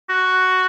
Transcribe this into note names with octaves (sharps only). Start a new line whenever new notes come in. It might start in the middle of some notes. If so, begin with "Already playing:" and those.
F#4